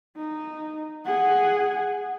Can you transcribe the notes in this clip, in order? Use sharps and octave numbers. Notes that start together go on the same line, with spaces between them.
D#4
G#4 F#5